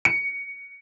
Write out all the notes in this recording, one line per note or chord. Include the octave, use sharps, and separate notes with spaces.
C#7